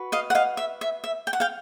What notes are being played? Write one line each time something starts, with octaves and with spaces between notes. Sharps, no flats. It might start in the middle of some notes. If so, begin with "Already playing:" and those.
Already playing: F#4 B4
D#5 F5
F#5
D#5 F5
E5
E5
E5
G5
F#5
F5 G5